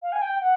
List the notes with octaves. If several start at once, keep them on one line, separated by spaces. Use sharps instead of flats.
F5
G#5
G5
F#5